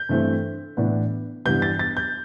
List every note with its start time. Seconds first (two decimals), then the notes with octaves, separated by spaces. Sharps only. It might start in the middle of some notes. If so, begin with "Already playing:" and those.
Already playing: G6
0.09 G2 E3 A3 C4
0.77 A2 E3 B3 D4
1.45 G2 E3 G3 B3 G6
1.62 A6
1.79 A6
1.97 G6